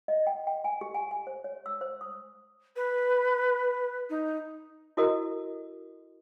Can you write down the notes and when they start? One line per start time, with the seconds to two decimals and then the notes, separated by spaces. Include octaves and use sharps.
0.08 D#5
0.27 G5
0.47 G5
0.64 G#5
0.81 G4
0.95 G#5
1.11 G#5
1.27 C5
1.44 C#5
1.66 E6
1.81 C5
2.01 D#6
2.76 B4
4.09 D#4
4.97 E4 F#4 A4 A#4 D#5